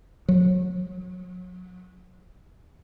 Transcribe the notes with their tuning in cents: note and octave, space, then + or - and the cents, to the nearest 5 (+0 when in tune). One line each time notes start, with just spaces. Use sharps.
F#3 -30